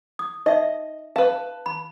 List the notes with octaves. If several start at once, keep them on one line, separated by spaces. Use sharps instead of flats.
D#6
D#4 D#5 E5
B4 F5 A5
B5